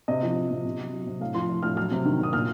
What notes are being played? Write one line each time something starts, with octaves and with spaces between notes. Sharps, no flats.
C3 D#5
F3
F3
C3
C3
F#3
F#3
C3
A2 F5
F3 C6
F3
A2 F6
F#3 F6
C3
D#3
C3 D#6
A#2 F6